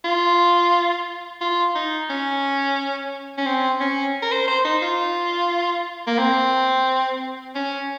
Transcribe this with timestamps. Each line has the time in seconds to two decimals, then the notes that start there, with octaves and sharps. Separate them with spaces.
0.05 F4
1.41 F4
1.75 D#4
2.10 C#4
3.38 C#4
3.46 C4
3.81 C#4
4.22 A#4
4.32 C5
4.48 C5
4.65 D#4
4.82 F4
6.07 A#3
6.18 C4
7.55 C#4